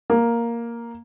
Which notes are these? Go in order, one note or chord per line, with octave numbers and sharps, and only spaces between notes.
A#3